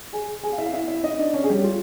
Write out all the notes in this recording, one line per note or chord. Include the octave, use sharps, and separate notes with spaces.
G#4 G#5
G#4 G#5
F5
E4 E5
F5
E4 E5
E4 E5
D#4 D#5
D4 D5
C#4 C#5
G#4
G3 G4
F4